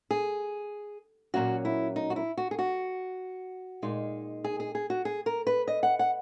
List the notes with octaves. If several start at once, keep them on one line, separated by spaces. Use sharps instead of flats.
G#4
A#2 F#3 A#3 C#4 F#4
E4
D#4
F#4
E4
F#4
G#4
F#4
A#2 G#3 D#4
G#4
G#4
G#4
F#4
G#4
A#4
B4
D#5
F#5
F#5